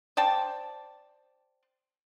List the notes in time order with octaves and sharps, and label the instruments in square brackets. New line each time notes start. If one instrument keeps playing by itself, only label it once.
[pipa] C5 D5 G5 A5